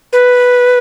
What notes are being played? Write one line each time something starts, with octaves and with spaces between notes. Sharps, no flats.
B4